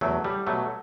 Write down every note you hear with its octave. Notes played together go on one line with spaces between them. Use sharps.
E2 F#3 A3
G3
B2 F#3 A3